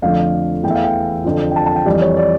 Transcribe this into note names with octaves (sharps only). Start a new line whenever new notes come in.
F2 D3 F3 A3 F5
E2 E3 A3 G5
E5
F5
G5
F2 D3 F3
G5
A5
A5
G5
F2 E3 G3 D5
C#5
D5